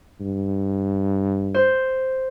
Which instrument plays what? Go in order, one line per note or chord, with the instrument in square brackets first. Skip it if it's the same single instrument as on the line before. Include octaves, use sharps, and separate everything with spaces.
[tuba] G2
[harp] C5